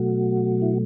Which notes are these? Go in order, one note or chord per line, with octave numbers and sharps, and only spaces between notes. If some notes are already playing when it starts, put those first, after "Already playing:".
Already playing: B2 F#3 A3 F#4
E4